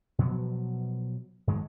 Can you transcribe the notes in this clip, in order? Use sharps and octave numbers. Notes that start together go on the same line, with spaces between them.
B2 F3 F#3 B3
G#2 D#3 G#3 A3